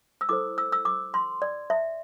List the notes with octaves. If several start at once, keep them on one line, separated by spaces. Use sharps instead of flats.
E6
E4 A4 C5 D6
E6
E6
D6
C6
D5
E5